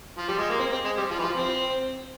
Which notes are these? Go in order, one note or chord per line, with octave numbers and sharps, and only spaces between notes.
F3
G3
G#3
A#3
C4
C4
G#3
G3
F3
E3
F3
C4